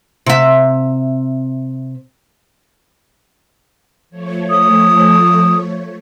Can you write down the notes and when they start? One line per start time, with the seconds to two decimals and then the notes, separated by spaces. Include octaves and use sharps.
0.26 C3 E5
4.10 F3 A3 C#5
4.50 D#6